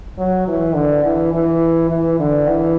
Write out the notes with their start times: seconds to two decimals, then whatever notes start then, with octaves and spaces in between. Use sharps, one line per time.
0.18 F#3
0.48 E3
0.75 D3
1.04 E3
1.34 E3
1.90 E3
2.19 D3
2.48 E3